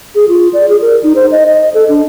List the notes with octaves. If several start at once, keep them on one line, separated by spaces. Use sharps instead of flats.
G#4
F4
D5
G#4
A#4
D#4
C5
D#5
D#5
A4
D4